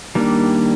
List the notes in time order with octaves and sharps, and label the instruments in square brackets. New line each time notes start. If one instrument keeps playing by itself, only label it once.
[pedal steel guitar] D#3 G3 A#3 D4